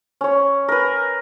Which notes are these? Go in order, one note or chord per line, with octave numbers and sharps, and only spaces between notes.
C#4 C#5
A#4 B4